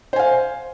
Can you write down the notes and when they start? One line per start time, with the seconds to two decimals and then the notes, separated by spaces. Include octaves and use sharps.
0.13 C5
0.16 G#5
0.19 F5